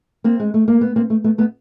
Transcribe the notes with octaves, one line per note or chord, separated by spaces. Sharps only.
A#3 C4
G#3
A3
A#3
B3
A#3 C4
A3
A3 B3
A3 B3